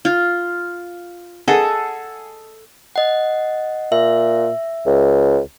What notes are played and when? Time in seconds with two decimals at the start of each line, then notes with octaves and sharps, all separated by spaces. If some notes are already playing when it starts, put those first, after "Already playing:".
0.05 F4
1.48 G#4 A4 D#5 F#5
2.96 D#5 F#5
3.92 A#2 E5
4.86 C#2